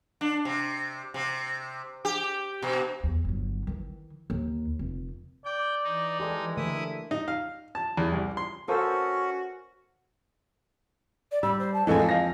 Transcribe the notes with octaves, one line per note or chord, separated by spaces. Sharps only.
D4
C3
C3
G4
B2
E2
G1 F#3
D#3 E3
D#2
F1
D5 G5
E3 D#4
G#3 G4 A4 D5
D3 A3 E4 A#4 D#6
D#4
F5
A5
E2
C2
C6
C#4 F#4 A4 A#4 C5
D5
G3 B5 E6
C5
A5
F2 E3 G#3 A4 D#5 G#5
F5 A#6